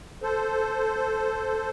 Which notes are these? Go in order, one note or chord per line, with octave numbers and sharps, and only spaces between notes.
A4 C5